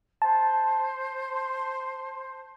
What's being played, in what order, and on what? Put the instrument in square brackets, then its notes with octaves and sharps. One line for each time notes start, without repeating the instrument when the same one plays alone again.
[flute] C5 [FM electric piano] A5